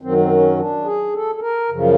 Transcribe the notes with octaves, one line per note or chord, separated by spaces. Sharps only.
F#2 D#3 F#3 C4
C4
C#4
D4
G#4
A4
A4
A#4
F#2 C#3 F3